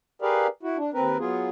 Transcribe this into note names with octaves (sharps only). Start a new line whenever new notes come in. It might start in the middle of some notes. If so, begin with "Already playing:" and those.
G4 G#4 A#4 B4 D5 F5
E4 F#4
D4
D#2 C4 A#4 B4
F#3 B3 F4 G#4